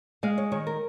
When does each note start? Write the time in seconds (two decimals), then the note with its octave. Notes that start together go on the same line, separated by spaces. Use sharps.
0.23 G#3 F5
0.38 C#5
0.52 D#3 C#5
0.67 A#4